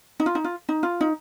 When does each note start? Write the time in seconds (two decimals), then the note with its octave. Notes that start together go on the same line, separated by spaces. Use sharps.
0.20 D#4
0.26 F4
0.35 D#4
0.44 F4
0.69 D#4
0.83 F4
1.01 D#4